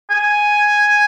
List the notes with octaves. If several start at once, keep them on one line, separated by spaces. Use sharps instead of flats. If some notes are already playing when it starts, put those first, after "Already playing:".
G#5